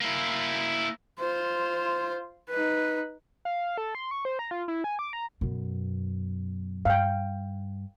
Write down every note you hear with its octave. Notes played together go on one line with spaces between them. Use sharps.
A#3 E4
F4 C5
D#4 B4
F5
A4
C6
C#6
C5
A#5
F4
E4
G#5
D6
A#5
F#2 B2
G2 F5 G5